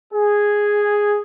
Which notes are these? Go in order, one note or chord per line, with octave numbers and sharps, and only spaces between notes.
G#4